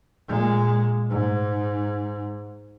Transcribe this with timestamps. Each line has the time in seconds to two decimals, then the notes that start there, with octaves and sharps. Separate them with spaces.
0.28 A#2 G#3
1.10 G#2